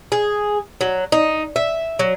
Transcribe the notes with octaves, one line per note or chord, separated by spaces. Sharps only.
G#4
F#3
D#4
E5
F#3